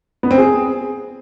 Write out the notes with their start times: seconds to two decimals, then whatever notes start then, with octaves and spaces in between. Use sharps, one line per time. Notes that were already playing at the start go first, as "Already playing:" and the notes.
0.23 B3
0.31 C4
0.38 G#4